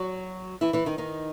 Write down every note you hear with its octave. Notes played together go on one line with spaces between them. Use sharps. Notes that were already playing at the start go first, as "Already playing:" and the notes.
Already playing: F#3 F#4
E3 E4
E3 E4
D#3 D#4
D#3 D#4